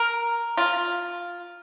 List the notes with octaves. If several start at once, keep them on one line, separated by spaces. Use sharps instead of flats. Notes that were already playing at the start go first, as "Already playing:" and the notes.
Already playing: A#4
F4